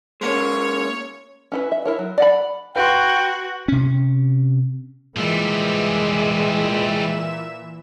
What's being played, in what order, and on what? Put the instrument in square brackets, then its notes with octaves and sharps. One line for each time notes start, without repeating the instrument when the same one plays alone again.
[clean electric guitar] G#3 A#3 C#4 [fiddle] C#5
[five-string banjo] C#4 E4 B4
E5
E4 A#4 C#5
F#3
D5 F#5 B5
[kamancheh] F#4 [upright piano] B4 C6 [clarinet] G5
[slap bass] C3 C#4
[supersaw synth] A#2 E5 E7 [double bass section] E3 [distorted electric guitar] F3 G3 [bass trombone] G#3